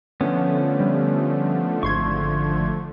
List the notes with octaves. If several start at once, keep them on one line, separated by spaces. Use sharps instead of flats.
D3 F3 A3 B3 C#4
G3
G#1 C6 C#6 G#6